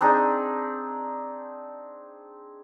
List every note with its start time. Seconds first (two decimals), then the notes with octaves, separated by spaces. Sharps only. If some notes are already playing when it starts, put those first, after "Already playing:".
0.01 C4 D4 D#4 G#4